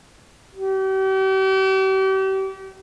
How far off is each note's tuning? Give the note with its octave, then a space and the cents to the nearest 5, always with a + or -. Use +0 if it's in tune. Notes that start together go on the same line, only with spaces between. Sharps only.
G4 -40